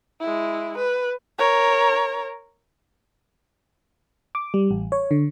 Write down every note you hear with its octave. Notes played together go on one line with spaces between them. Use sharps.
G#3 E4
B4
A#4 C#5
D6
G3
A1
C#5
D3